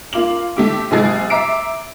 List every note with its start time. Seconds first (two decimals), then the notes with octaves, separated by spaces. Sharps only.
0.13 A#3 F4 D6 F#7
0.57 A3 G4 D6
0.91 F#1 C3 G#3 G#4 G#5 A6
1.30 E5 A#5 D6 C7 D7